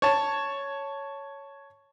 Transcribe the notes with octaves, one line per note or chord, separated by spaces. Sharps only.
C#5 A5